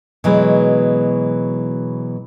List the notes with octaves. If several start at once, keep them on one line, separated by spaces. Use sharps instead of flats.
B2 E3 F#3 G#3